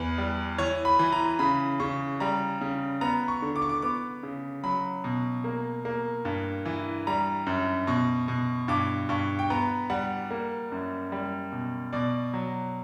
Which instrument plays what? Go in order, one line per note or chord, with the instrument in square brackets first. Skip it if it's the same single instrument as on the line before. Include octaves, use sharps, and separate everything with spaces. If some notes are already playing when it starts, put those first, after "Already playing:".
Already playing: [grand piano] E2 B4
G3
E3 C#5
B5
E3
A#5
C#3 B5
C#3 C#6
G3 A#5
C#3
B3 A#5
C#6
D3
D6
C#6
D6
B3 D6
C#3
F#3 B5
B2
A#3
A#3
G2
E3
G3 A#5
F#2
B2 C#6
B2
G2 D6
G2 C#6
G5
B3 A#5
G3 F#5
A#3
F#2
G3
B2
B2 D5
F#3